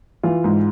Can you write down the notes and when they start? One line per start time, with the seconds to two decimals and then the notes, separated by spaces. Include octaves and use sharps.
0.23 E3 F4
0.44 G#2